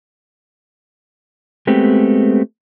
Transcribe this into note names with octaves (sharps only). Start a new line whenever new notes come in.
G#3 A3 B3 C4 G4